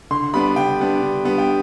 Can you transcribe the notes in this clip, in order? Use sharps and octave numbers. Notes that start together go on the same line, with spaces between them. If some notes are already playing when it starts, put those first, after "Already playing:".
D3 C6
G3 B3 D4 B5
D3 G5
G3 B3 D4
D3
G3 B3 D4
G5